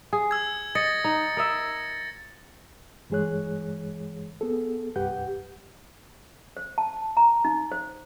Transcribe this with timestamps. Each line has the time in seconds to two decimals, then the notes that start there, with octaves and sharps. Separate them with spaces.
0.13 G#4
0.31 E6 G#6
0.75 D#5 A6 A#6 C#7
1.04 D#4
1.37 A#4 D#5 E5
3.10 G2 E3 G#3 G#4 C#5 F#6
4.41 B3 G#4 A4
4.96 C2 G2 G4 B4 F#5 G6
6.57 C5
6.78 A5
7.17 A#5
7.45 D#4
7.72 C5